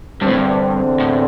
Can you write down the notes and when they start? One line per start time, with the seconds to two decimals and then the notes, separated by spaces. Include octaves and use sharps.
0.21 E2 G2 D3 C4
0.28 A2
0.35 G2
1.00 A2